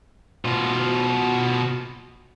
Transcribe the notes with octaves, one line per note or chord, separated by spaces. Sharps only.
B2 F4